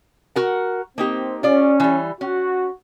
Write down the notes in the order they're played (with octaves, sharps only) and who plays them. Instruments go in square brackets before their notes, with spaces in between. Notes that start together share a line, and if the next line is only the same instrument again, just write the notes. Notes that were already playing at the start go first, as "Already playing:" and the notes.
[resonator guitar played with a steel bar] F#4 A#4 F#5
[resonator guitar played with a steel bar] A#3 D#4 G4 [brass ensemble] C4
[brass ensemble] C#4 [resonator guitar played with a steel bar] F4 D5
[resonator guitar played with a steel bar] E3 G3
[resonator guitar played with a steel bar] C#4 [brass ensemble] F#4